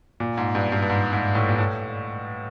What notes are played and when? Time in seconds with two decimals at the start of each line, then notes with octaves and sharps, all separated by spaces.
0.20 A#2
0.37 G#2
0.55 G2
0.72 G2
0.82 G2
0.90 G#2
1.13 G#2
1.35 A2
1.49 A#2
1.58 A2